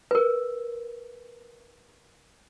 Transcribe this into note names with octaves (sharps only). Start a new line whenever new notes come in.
A#4 B4